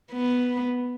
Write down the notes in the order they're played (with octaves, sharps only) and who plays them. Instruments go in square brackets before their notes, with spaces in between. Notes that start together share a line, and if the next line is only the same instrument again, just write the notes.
[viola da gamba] B3